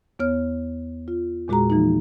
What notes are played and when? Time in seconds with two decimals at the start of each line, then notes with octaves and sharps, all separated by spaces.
0.19 E2 B3 C#5 F6
1.08 F4
1.48 E2 A#2 G#3 F#4 G#4 A#5
1.70 E3 F3 G#3 A#3 D#4